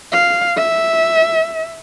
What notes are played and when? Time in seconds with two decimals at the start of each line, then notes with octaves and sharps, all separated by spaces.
0.12 F5
0.57 E5